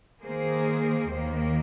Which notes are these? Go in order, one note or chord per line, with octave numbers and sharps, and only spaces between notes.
D#3 A#3 G#4 C5
D#2 D#3 A#3